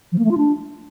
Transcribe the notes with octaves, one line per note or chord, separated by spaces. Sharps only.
F3
A#3
A3
F4
D4